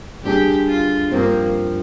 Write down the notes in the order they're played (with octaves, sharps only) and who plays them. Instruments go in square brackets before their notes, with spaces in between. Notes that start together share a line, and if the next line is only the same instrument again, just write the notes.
[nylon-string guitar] D3 G3 D4 G#4 [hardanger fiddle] G4
[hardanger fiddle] F4
[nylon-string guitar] G2 F3 C4 [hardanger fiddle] A#3